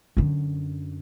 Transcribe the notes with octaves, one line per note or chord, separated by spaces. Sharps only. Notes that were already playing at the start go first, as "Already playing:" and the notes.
F#2 D3